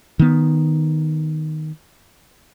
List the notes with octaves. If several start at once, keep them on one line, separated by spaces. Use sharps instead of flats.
D#3 B3